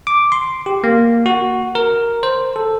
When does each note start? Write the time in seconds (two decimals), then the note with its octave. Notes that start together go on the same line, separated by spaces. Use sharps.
0.07 D6
0.32 C6
0.66 G4
0.84 A#3
1.26 F#4
1.75 A#4
2.23 C5
2.56 A4